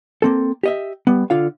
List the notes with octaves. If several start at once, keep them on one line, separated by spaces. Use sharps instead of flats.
A#3 C4 A4
G4 D#5 E5
G3 B3
D3 F4 F5